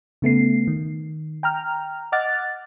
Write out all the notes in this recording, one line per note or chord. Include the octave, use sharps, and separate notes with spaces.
C#3 A3 B3 C7
D#3
G5 A#5 F6
D#5 F#5 D6 F6 F#6 A6